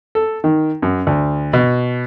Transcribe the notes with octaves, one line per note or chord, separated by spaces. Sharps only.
A4
D#3
F#2
D2
B2